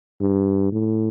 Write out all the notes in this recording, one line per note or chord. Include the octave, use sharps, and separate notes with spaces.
G2
A2